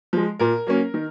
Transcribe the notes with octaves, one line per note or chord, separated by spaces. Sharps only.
F3 G#3
A#2 A#4
F#3 A#3 C#4
D#3